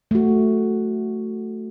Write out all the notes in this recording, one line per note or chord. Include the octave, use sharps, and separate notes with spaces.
A3 F#4